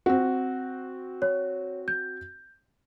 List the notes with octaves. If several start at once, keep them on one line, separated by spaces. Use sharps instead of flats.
C4 F#4 F#5
C#5
G6